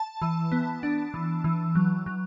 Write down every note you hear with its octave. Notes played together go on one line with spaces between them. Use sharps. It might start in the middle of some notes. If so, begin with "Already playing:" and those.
Already playing: A5
E3
B3
D4
E3
E3
F#3
F#3